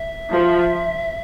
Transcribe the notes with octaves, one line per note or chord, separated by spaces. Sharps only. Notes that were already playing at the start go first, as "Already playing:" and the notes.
Already playing: E5
F3